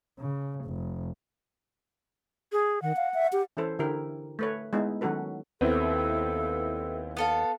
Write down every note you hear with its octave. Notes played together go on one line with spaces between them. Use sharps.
C#3
F1
G#4
D#3 F#5
F5
E5
G4
E3 C#4 E4 A4 C5
D3 E4 G4 A#4
A3 B4 C#5
G#3 B3 D#4 E4
D#3 F#3 C#4 F#4 A4 B4
D#2 B3 C4 E4 A4
B3 A4 F5